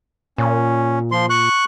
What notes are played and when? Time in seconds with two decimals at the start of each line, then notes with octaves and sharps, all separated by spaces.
0.38 A#2 C#4
1.12 F3 C6
1.30 C#6 F#6